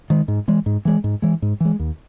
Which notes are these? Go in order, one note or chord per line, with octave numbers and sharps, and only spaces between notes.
D#3 G#3
G#2
E3 G#3
G#2
E3 G#3
G#2
E3 G#3
G#2
E3 G#3
D#2